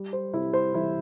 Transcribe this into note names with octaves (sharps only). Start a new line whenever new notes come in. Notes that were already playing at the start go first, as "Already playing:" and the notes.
Already playing: G3
C5
C3 E4 E5
C5
E3 E4 E5